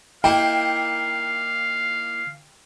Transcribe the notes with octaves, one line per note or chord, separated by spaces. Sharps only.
A#3 D#4 E4 F5 G5